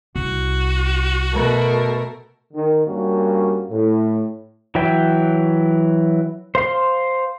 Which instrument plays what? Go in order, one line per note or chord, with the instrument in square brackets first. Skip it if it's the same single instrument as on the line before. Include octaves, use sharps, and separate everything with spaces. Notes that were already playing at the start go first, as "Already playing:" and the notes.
[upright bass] C2 [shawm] F#4
[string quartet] B2 A3 A#4
[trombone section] D#3
G2 G3 A#3 C#4 F#4
A2
[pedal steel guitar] E3 F#3 C#5 E5 G5
C5 F5 C6